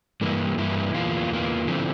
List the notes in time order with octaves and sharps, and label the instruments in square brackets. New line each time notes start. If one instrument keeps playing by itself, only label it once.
[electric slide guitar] G2 E3 A#3 E4
G2 E3 A#3 E4
E2 E3 A#3 F4
E2 E3 A#3 F4
D3 F3 C4 E4